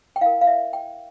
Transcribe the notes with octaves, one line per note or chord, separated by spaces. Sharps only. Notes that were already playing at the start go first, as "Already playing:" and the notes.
G5
E4 A#4 F5
F5
E5
G5